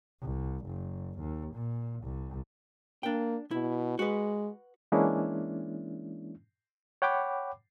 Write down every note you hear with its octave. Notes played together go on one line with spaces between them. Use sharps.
C2
F#1
D#2
A#2
C2
A#3 D4 G5
B2 E4
G#3 F#4 B4
E3 G#3 A#3 C#4 D4 E4
C#5 F#5 G5 B5 D6